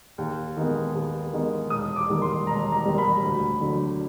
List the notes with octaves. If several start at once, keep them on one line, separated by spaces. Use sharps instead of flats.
D#2
D#3 G#3 B3
D#2
D#3 G#3 B3
E1 D#6
D6
D#2 D#3 G3
C6
E1 A#5
A#5
D#2 D#3 G3
B5
D2
D3 F#3